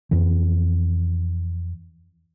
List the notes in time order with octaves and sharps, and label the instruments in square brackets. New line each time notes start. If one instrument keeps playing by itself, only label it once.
[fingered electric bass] F2 E3